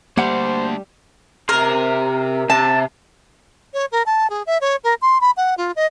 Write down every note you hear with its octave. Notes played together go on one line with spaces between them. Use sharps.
G3 A3 A#3 D4 C5 F#5
C3 A#4 C6
C3 A5
C#5
A#4
A5
G#4
E5
C#5
A#4
C6
B5
F#5
F4
D#5